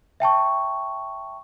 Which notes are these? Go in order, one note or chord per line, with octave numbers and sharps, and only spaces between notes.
E5 G5 A5 C#6